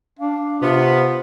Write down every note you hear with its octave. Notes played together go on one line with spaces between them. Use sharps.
D4 F5
C3 B3 F4 C5